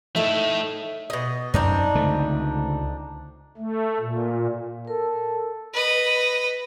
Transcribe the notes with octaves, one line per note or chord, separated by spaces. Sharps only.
A3 D#4 E4 A4 E5
B2 D#5
F#2 C4 D4 D#4
C#2 D3 A3
A3
A#2
A4 A#4
B4 D#5